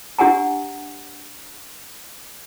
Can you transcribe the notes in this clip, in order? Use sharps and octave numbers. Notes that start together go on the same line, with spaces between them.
D4 G4 F#5 G#5 A#5